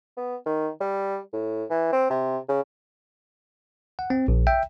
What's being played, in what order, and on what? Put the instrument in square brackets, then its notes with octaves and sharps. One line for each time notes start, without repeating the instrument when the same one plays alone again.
[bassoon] B3
D#3
G3
A2
E3
C4
C3
C#3
[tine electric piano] F#5
C4
A#1
E5 G5